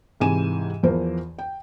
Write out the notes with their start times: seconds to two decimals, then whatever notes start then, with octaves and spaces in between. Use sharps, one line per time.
0.20 G#2 C3 E3 G#5 D#7 E7
0.83 E2 E3 F3 A#4 C5
1.39 G5